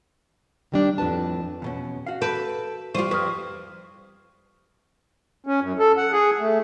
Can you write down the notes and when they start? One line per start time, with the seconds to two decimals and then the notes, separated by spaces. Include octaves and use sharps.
0.72 D#3 G3 D4
0.98 F2 A2 B4 A5
1.62 E2 B2 C#4
2.06 F#4 F5
2.22 A4 B4 G6 D7 E7
2.95 G3 F4 G4 C5 C#6 D#7
3.11 F2 B4 C#6 D#6 F6
5.46 C#4
5.61 F#2
5.79 A4
5.97 F#5
6.12 G#4
6.40 A3